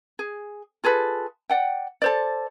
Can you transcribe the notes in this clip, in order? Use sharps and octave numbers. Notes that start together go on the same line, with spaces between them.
G#4
F4 G#4 A4 B4
D5 F#5 G5
A4 C5 D5